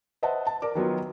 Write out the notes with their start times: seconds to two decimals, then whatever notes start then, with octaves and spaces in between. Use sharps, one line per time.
0.23 B4 C5 D#5 E5 F#5 A5
0.47 A5
0.62 A#4 D5 D6
0.75 D#3 F#3 B3 F4